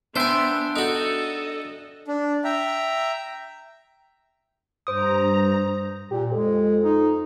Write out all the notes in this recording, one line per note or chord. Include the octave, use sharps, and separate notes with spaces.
B3 D4 C5 E5 G5 G#5
D#4 F#4 A4 D#5
D4
E5 G5 A#5
G2 C5 A#5 D#6
A#2 G4
F2 G#3
D#4